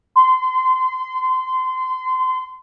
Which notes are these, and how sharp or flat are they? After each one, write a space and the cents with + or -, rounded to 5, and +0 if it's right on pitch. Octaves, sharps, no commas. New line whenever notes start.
C6 -25